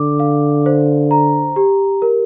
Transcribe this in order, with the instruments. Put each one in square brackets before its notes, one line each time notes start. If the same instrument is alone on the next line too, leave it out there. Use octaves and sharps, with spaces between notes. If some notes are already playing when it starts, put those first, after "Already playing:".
Already playing: [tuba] D3 [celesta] D6
[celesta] F5
C5
A#5
G4
A#4